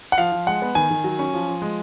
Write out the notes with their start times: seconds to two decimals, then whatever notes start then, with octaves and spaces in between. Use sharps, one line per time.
0.12 F#5
0.18 F3 F5
0.32 F3
0.47 G#3 F#5
0.62 B3
0.75 D#3 G#5
0.91 D#3
1.04 F#3
1.19 C#4
1.34 F3
1.48 F3
1.62 G#3